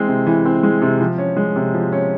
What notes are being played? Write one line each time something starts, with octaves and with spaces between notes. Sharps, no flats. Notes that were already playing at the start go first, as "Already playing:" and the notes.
Already playing: E3 G#3 C4
C3
E3
C4
G#3
C3
F3
C#4
G#3
C3
F3
C#4